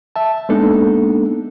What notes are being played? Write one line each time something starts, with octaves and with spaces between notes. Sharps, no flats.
E5 A5
G#3 A#3 B3 D4 D#4 A4